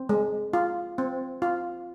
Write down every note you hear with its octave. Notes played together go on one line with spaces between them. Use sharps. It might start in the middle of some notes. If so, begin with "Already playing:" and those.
Already playing: C4
G#3
F4
C4
F4